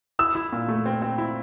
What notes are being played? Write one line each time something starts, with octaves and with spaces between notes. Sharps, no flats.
E4 E6
E4
A#2
A3
C4
C4
E4